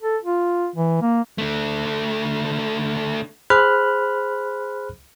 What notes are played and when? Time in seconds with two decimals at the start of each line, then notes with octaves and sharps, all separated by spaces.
0.02 A4
0.24 F4
0.76 E3
1.02 A#3
1.38 D3 A3
3.50 G#4 C5 B5 F6 F#6